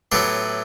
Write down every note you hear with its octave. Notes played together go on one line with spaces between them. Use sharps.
A2 F#3 B3 E4 G4 B4